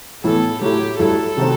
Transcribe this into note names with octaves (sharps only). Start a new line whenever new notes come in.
A2 E3 B3 E4 A4
A2 F#3 A3 E4 G4
G2 F#3 A3 E4 A4
C3 D#3 F#3 A3 C4